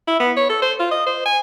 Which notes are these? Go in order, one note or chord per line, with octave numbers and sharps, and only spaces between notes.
E4
B3
C#5
A4
C5
F4
D#5
C5
G#5